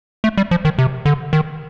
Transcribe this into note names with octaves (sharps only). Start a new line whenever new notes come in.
A3
G3
F3
D#3
C3
D3
D#3